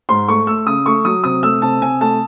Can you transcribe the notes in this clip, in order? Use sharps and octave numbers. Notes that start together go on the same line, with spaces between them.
G#2 C6
A3 C#6
A3 E6
C#3 D#6
A3 C#6
F#3 D#6
C3 D#6
A3 E6
C3 A5
C3 G#5
A3 A5